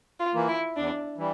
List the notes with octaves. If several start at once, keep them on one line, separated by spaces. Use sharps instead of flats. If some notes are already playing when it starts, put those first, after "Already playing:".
F4
E3 A#3
E4
E2 D4
E3 G3